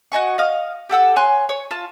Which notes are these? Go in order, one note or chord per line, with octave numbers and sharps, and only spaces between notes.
F#4 D#5 G#5 C#6
D#5 F5 D#6
G4 A4 F#5 E6
C#5 G#5 C6 F#6
C#5
F4 A5